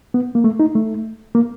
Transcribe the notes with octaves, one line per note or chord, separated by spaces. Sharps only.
B3
A#3
A3
D#4
A3
A#3